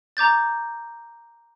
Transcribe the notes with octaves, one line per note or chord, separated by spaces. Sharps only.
A#5 D6 G6 A6